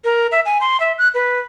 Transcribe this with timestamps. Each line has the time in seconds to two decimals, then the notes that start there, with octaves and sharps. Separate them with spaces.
0.04 A#4
0.32 E5
0.46 G#5
0.61 C6
0.80 E5
0.98 F#6
1.14 B4